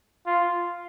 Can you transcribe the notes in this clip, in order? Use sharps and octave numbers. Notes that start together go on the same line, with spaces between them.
F4